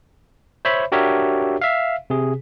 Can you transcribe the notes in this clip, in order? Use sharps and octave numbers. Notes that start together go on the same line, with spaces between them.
C5 C#5 E5 B5
D4 F#4 G4 A#4 C#5 E5
E5 F5
C3 G#4